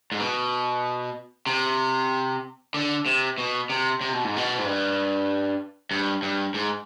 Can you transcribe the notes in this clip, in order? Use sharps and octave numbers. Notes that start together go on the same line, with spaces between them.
G#2
B2
C3
D3
C3
B2
C3
C3
B2
G#2
B2
G#2
G2
G2
G2
G#2